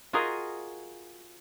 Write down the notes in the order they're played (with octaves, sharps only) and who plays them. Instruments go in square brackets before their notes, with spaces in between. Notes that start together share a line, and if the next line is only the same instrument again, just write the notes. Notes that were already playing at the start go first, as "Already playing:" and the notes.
[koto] F4 F#4 G#4 A#4 D#5